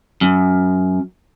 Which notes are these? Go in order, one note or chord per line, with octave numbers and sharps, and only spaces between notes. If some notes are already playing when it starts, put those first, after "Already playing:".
F#2